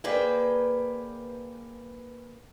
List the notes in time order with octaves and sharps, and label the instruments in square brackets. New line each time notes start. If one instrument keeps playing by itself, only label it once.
[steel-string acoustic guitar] A#3 G#4 B4 C5 D5 G5